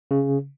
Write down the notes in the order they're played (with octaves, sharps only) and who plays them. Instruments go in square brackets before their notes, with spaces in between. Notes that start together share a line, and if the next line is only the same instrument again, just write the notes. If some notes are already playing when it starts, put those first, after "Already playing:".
[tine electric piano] C#3